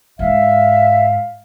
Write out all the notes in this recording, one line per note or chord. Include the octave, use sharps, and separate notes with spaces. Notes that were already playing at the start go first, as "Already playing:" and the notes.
G#2 E5 F5